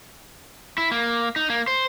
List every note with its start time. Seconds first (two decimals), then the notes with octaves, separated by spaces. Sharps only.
0.78 E4
0.91 A#3
1.36 D#4
1.50 A#3
1.67 C5